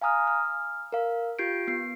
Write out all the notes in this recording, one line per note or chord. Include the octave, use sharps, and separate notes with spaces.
F5 G#5 A#5 D#6 F6
F6
A#4 F5
F4 G4 G6 C7 D7
B3 C7